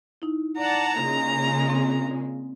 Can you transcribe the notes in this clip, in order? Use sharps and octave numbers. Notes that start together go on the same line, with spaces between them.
D#4 E4
D5 F#5 A5 A#5
A#2 C#3 G#3
C4